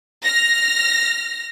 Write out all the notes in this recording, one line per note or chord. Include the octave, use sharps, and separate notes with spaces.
F6 A#6